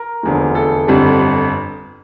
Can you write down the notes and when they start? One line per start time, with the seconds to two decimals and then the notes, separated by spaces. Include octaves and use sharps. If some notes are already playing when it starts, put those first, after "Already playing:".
Already playing: A#4
0.23 F1 E2 D3 F3
0.55 A4
0.87 G1 F2 D3 G3